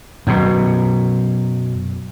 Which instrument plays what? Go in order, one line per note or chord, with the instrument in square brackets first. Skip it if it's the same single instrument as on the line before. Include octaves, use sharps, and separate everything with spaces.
[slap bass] F#2 B2